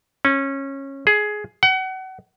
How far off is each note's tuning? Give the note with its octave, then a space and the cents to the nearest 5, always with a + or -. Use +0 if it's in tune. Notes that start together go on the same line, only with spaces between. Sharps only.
C#4 -20
G#4 +15
F#5 +30